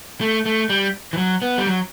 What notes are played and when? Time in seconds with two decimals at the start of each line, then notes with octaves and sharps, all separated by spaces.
0.21 A3
0.46 A3
0.70 G3
1.13 E3
1.17 F#3
1.42 B3
1.58 G3
1.66 F#3